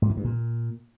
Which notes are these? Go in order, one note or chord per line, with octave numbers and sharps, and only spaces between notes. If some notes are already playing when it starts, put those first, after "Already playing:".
G#2
E3
G2
A#2